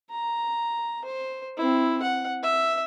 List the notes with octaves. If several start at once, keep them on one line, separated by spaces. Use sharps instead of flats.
A#5
C5
C4 E4
F#5
E5